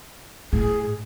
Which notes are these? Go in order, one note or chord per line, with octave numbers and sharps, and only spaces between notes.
A2 G#4